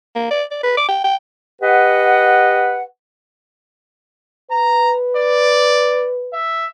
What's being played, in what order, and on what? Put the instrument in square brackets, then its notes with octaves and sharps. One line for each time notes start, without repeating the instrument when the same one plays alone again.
[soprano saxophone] A#3
D5
D5
B4
D6
G5
G5
[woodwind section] G4 B4 D#5 F#5
[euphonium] B4 [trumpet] A#5
[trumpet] D5
E5